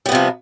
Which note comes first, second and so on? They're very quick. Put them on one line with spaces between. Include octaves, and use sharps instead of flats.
G3 B3 C3 F3